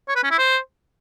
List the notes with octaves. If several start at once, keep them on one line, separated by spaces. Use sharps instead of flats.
C#5
B4
C#4
E4
C5